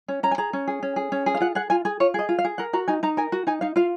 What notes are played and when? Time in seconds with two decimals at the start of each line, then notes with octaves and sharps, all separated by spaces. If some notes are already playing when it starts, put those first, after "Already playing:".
0.08 C#4
0.23 C#4 A#5
0.31 G#5
0.38 G#4 A#5
0.53 C#4
0.68 G#4
0.83 C#4
0.96 G#4
1.12 C#4
1.26 G#4
1.35 F5
1.40 F4 F#5
1.55 G#4 F#5
1.70 F4 G#5
1.85 G#4 G#5
2.00 F4 C#5
2.14 G#4 D#5
2.29 F4
2.39 F5
2.45 G#4
2.58 A#4 F#5
2.73 F#4 A#5
2.88 D#4 G#5
3.03 D#4 A#5
3.17 A#4 G#5
3.32 F#4
3.47 D#4 G#5
3.61 D#4 F5
3.76 F4 F5